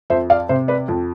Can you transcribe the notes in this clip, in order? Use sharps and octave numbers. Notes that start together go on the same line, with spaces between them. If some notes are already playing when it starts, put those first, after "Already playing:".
F2 C5 E5
D5 F5
C3 C5 E5
B4 D5
F2